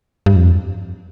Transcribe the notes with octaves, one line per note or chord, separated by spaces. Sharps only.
G2
F2